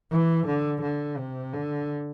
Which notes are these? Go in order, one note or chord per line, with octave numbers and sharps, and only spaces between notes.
E3
D3
D3
C3
D3